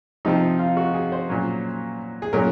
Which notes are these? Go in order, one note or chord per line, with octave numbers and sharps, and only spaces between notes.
C3 F3 C4 D#4
F4
F#4
G#4
C5
A#2 F#3 C#4
G#4
A#2 F#3 C#4 A#4